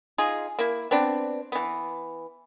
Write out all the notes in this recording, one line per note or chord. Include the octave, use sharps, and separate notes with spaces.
D#4 F4 G#4
A#3 E4
B3 C4 D4
E3 B3